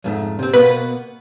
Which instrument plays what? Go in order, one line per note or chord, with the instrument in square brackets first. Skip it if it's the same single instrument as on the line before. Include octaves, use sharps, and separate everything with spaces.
[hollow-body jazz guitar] F2 G#2 A3
C3 C4
[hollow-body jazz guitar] B2 A#3 B3 [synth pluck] B4